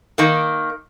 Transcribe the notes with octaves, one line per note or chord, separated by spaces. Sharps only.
D#3 A#3